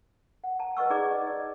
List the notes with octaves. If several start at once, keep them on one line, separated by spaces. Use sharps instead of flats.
F#5
A5 A#5
F#4 B4 D#5 F#5 C#6 E6
D#4 G#4 D5 A#5 D6
D5 D#5
D5